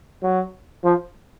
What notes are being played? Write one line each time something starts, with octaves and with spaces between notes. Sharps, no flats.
F#3
F3